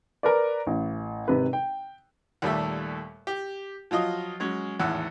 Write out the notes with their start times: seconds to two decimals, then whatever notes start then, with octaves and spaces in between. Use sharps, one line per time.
0.23 A#4 B4 D5
0.67 A1
1.28 G#1 C3 B4
1.53 G5
2.42 D#2 A#2 G3 A3 A4 E5
3.27 G4
3.91 F3 F#3 F4 D#5 D#6
4.40 F#3 G#3 C#4
4.79 G#1 E2 A2 F#5 E6 F#6